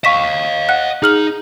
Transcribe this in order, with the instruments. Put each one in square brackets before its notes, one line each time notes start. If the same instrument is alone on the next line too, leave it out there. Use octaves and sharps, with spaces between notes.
[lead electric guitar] D#5 F5 [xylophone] C#6 B6 E7
[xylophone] F#5 F#6
[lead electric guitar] D#4 [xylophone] G#4 F6 F#7